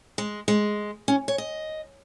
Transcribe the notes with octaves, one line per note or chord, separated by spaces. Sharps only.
G#3
G#3
C#4
C#5
D#5